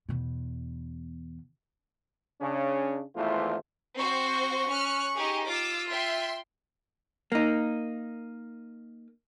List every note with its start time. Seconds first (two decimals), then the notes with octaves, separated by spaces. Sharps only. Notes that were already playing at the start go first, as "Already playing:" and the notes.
0.09 E2 B2
2.41 C#3 C#4 D4
3.16 G#1 E2 E3 A3 F4 C5
3.98 C4 F#4 C5 C#6
4.70 C#4 F6 F#6
5.15 D#4 G4 G#4
5.47 F4 D6 E6
5.89 E5 G5 C6
7.32 A#3 D#4